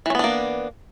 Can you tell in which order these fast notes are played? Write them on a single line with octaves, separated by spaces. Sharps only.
E3 C#4 B3 D4 A#3